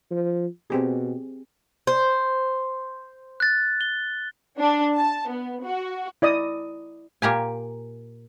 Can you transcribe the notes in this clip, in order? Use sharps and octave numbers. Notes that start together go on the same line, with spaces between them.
F3
B2 C4 G4 G#4
C5
F#6 A6
G7
D4
A5
B3
F#4
E4 D5 D#5 D#6
A#2 A#3 G4 G#5